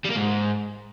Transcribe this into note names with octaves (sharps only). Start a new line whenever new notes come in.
G3
A#3
G#2